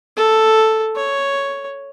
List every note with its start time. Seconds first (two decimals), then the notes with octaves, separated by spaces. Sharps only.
0.16 A4
0.96 C#5